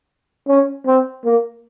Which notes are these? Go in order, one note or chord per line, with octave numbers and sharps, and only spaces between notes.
C#4
C4
A#3